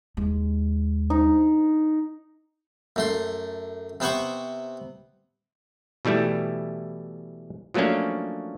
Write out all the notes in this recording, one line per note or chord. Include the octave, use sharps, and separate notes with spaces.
D#2 G#3
D#4
F#2 A3 C6
C3 B3 C5 F#5 C#6
B2 E3 G3 A3 E4
F3 F#3 A3 A#3 C#4 D4